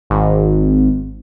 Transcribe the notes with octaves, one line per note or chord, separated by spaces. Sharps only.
G#1